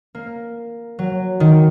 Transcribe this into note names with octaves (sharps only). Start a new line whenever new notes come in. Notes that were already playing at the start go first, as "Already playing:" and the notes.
A#3
F#3
D#3